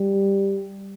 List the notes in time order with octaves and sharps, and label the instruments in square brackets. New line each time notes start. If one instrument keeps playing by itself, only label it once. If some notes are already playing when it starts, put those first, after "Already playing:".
Already playing: [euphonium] G3